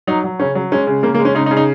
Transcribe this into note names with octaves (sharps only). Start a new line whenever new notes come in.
F#3 D#4
F#3
C#3 C#4
F#3
G#3 C#4
C#3
C#3 A#3
A#3
G#3
C#4
C#3 D#4
D#4
C#3
D#4